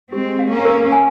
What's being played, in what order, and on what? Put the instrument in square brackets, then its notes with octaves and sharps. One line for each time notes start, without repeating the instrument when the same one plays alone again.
[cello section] G#3 C4 [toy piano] G4
[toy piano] F5
[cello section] A#3 C#4
[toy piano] A#4
G#5